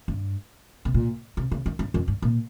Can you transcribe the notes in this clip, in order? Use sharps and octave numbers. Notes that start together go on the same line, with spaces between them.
G2
C3
A#2
C3
C#3
D#3
G2
F2
G2
A#2